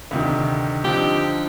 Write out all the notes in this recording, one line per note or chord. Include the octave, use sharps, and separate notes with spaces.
D2 C3 D#3
D3 F3 C4 D#4 G4